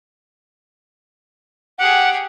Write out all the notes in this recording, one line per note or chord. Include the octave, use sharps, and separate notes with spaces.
G4 G#4 F#5